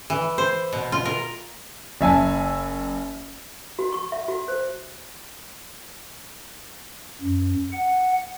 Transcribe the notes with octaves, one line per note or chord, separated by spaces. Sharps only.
E3
C5
B2
F4
A#4
F#1 E5 G#5 A5
F#4
C#6
E5
F#4
C5
F#2
F#5